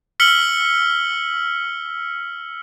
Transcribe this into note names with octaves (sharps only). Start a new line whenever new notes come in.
E6 F6 B6 C#7 F#7 G7